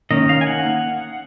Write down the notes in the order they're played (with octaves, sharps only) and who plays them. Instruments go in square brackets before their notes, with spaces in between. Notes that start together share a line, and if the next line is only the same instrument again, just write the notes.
[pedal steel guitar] D#3 A#3 C#4 D#5
F5
G#5
F#5